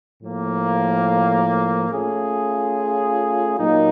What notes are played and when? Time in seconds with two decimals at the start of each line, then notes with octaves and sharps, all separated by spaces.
0.22 A2 F3 A#3
1.90 A3 C#4 F4 G#4
3.57 A#2 F#3 A#3 D#4